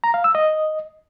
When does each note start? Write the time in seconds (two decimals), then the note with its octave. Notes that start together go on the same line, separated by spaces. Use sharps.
0.04 A#5
0.14 F5
0.24 E6
0.35 D#5